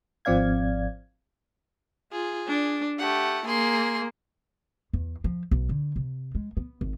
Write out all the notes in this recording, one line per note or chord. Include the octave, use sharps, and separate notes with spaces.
G#1 F3 C4 D5 F5 G#6
F4 G#4
D4
A3 G4 F#5
A#3 G#4 C6
E2
F3
B1
D3
C3
G#3
B3
G#1